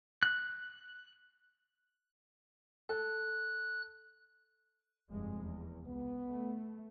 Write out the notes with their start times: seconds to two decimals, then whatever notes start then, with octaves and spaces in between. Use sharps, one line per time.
0.23 F#6
2.89 A4 F#6
5.10 F1 G2 G#3
5.40 E2
5.87 C#2 B3
6.29 A3